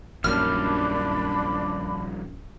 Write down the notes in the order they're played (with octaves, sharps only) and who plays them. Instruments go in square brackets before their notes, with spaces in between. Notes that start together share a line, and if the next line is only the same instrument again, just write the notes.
[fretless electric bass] A#1 F#2 [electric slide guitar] D#3 F3 G3 [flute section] D4 B5 [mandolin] F6